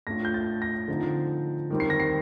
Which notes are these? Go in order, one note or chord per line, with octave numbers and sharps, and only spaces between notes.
A2 A3 D4 F4 A#6
G6
A6
A#6
D3 F3 C4 D#4
D#3 G3 C4
C7
A#6
C7